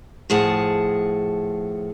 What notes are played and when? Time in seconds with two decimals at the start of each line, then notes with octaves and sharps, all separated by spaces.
0.30 A2 F3 G#4 F#5 A5